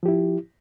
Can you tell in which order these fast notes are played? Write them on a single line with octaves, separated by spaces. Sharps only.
F3 G4 E4